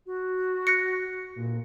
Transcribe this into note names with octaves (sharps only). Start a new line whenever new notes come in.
F#4
F#6 A#6 C#7
A#2